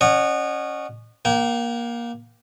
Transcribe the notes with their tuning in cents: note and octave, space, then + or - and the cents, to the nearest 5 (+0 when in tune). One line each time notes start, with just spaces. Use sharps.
C#4 +0 D#5 -35 F#5 +0
A#3 +20 G5 -30